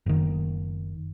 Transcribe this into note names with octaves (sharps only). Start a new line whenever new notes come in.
F#1 D#3